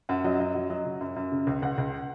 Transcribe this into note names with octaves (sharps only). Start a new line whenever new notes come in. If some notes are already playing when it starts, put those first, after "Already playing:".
F#2 F#5
F#3 D#5
F#2 D#5
F#3
F#3 D#5
C#3
F#2
F#2
C#3
C#2
C#2 F#5
C#2